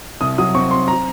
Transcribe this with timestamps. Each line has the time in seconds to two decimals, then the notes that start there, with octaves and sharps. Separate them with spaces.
0.21 C2 D#6
0.38 F#3 D#6
0.54 C4 C#6
0.71 C4 C6
0.88 A#5